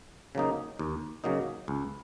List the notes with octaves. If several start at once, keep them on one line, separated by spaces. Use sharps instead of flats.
C#3 F#3 A#3 D#4
D#2
C#3 F#3 A#3 D#4
C#2